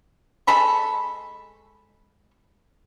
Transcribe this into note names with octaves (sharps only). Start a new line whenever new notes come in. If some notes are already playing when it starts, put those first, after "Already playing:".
G#3 A4 B5 C#6